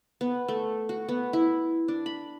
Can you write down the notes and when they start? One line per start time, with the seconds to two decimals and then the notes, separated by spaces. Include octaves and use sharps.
0.21 B3
0.48 A3
0.89 F#4
1.09 B3
1.33 E4
1.88 D4
2.06 B5